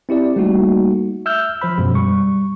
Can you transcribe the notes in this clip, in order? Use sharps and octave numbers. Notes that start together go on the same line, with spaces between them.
C4 E4 G4 D5
G3 A3 A#3 D#4 F#4
E5 E6 F6 G6
F3 C5 B5
F#2 B2 G#3
G3 C#6